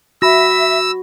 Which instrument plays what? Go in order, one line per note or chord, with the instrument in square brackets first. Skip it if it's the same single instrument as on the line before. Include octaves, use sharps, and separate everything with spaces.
[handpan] F#4 [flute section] E5 [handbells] B5 A#6 [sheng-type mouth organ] E6